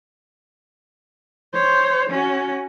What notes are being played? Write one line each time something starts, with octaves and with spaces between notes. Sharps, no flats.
C5 C#5
C#4 F#4